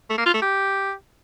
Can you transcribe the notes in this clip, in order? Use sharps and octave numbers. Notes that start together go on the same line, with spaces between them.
A3
A#3
F4
A3
G4